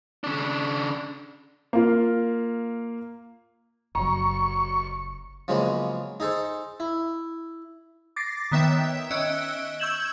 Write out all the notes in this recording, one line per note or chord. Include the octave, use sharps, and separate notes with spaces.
C#3 D4
A#3 F4
F#1 F#3 A#5 C#6
C#3 F3 F#3 G#3 A#3 B3
D#4 G#4 A4 C5
E4
D6 A6 A#6 C7
D#3 B3 C#5 E5 G5 E7
C#4 D#5 E5 E6 F#6 D7
C#6 E6 G6 G#6 E7 F#7